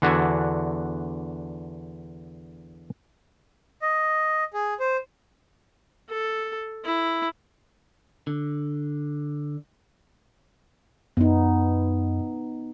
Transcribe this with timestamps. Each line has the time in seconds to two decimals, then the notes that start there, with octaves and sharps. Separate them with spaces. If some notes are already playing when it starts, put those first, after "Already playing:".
0.02 E2 D3 D4 F#4 E5 G#5
3.82 D#5
4.54 G#4
4.80 C5
6.09 A4
6.84 E4
8.27 D3
11.17 F#2 B3 D#4